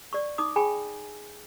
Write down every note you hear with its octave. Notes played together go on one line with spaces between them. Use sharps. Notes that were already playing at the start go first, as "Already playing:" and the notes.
D5 C#6
D#4 D6 D#6
G#4 G5 G#5 B5